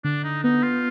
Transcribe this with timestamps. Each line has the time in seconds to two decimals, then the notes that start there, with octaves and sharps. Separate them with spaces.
0.04 D3 D4
0.24 D#4
0.43 B3 D#4
0.63 F4